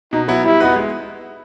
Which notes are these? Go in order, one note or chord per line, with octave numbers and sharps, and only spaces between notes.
B2 D#4
F#3 B3 E4
G3 E4
B3 D#4 F#4 B4
G#3